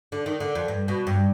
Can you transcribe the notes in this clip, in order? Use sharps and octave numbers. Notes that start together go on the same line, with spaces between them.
D3
D#3
D3
F2
G2
B2
G2